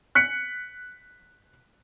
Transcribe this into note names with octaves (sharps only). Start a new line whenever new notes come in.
F#6 B6 C#7